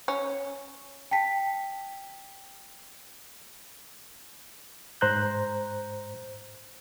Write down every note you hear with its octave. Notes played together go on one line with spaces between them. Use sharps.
C#4
G5 A5 B6
G#2 C5 A#5 F#6 G6